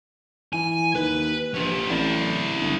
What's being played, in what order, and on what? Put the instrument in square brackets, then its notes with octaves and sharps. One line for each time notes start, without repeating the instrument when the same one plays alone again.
[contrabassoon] E3 [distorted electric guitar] G#5
[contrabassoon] D#2 [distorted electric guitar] B4
[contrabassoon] A#1 [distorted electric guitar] C#4 G4
[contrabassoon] A1 [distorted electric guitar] E4 D5
[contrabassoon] G1